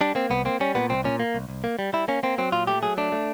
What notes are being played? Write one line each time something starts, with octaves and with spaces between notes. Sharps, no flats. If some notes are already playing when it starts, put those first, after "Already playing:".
G3 D4
A#3 C4
C2 B3
A#3 C4
G3 C#4
A#2 B3
C2 C4
A#2 C#4
A#3
C2
C2
A#3
G3
G3 E4
A#3 C#4
A#3 C4
F#3 C4
A#2 F4
A3 G4
F#3 G#4
A3 D4
A3